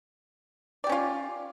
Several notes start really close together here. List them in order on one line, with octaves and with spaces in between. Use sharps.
D5 G4 C#4 F4